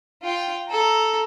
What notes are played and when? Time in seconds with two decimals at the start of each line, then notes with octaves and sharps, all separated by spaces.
0.23 F4 G5
0.69 A4 A#5